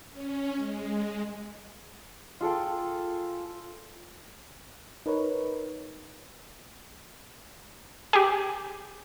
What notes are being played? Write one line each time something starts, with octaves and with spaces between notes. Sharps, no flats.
C#4
G#3
F4 G#4 A4 G5
D#4 A#4 B4 C#5
G4 G#4